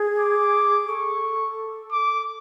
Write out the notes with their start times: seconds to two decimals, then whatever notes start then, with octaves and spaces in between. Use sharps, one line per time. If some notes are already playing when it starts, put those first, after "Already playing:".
Already playing: G#4
0.19 D6
0.88 A4 C#6
1.92 D6